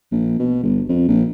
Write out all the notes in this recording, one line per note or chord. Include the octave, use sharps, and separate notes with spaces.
A#1
B2
G1
F2
A#1